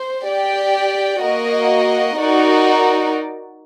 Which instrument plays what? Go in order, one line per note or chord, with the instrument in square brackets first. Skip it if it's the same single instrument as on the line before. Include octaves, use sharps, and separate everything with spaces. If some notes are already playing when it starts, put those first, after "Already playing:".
Already playing: [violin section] C5
G4 D5 G5
A#3 F#4 A#4 D#5
D#4 F#4 A#4 D5